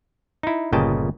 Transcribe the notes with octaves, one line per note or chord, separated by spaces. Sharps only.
D#4 E4
G1 A#2 C#3 D#5 G5 A5